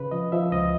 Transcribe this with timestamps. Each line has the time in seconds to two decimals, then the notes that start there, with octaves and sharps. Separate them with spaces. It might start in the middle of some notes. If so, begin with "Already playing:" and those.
Already playing: C#3 B4
0.11 F3 D#5
0.32 F3 E5
0.52 C#2 D#5